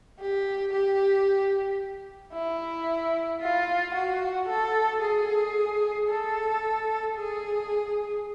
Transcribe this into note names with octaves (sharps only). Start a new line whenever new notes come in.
G4
G4
E4
F4
F#4
A4
G#4
A4
G#4